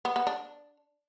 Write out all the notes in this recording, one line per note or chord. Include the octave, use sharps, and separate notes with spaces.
B3
B3
D4